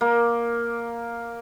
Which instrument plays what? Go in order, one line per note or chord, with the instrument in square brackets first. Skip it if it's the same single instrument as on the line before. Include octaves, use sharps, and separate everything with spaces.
[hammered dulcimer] A#3